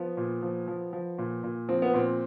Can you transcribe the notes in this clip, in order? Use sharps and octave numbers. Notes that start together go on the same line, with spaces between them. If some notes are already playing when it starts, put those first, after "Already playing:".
Already playing: F3 B3
A#2
F3
F3
F3
A#2
A#2
F3 C4
B3
A#2 C4